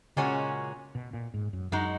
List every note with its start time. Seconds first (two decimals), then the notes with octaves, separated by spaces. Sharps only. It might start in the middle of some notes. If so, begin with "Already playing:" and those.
0.16 A#2 C#3 G#3 C#4 F#4
0.95 B2
1.13 A#2
1.34 G#2
1.53 F#2
1.72 F#2 G#3 D#4 F#4